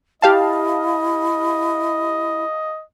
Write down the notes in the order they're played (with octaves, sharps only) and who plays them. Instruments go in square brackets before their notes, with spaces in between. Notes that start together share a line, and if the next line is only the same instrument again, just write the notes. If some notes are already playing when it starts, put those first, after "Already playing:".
[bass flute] E4 [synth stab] G4 F5 A5 [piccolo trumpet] D#5